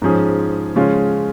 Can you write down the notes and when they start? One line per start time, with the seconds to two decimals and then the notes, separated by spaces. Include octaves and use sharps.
0.02 G#2 F3 C#4 G#4
0.75 C#3 F3 G#3 C#4 F4